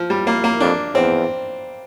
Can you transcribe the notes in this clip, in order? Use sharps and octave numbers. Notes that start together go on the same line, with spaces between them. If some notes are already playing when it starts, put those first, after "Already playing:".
Already playing: F3
G3
A#3
A#3
F2 D4
E2 C4